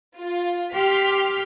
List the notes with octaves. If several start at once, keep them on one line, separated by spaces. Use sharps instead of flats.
F4
G4 C6 F6 B6